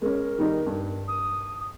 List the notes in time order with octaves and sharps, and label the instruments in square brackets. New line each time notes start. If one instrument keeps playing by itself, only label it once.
[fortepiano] G#3 C#4 [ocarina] A#4
[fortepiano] D#3 G3 D#4
G2
[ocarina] D#6